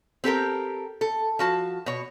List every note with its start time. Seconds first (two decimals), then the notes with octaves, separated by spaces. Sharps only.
0.24 C4 G4 A4 A#4
1.01 A4
1.39 F3 F#4 A5
1.86 B2 C#5